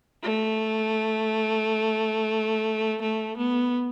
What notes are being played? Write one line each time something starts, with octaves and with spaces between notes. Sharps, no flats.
A3
A3
B3